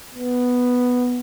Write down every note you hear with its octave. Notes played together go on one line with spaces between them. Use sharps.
B3